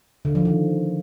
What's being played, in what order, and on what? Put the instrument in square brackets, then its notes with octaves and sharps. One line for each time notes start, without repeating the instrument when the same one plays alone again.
[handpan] D3
F3
D#3